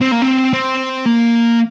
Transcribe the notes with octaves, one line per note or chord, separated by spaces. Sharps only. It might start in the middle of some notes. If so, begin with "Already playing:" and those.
C4
A#3
C4
C4
A#3